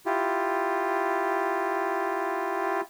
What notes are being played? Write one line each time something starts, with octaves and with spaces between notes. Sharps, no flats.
E4 F4 G4